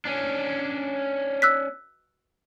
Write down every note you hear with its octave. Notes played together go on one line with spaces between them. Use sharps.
C#4 D4
E6 F#6 B6